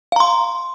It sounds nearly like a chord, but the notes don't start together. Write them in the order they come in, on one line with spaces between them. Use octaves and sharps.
F5 A#5 C6